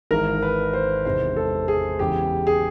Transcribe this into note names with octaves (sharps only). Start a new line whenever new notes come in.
G#1 G#2 E3 A#4
B4
C5
E1 E2 C3 D#3 C5
A4
G#4
E1 E2 C#3 G4
G#4